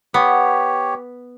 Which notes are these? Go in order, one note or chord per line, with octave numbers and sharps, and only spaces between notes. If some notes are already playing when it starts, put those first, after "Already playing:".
B3 G4 C#5